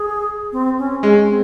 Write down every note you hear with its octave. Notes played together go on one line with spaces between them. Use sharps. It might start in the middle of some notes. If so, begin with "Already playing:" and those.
Already playing: G#4
C4
C#4
G#3 C#4
C4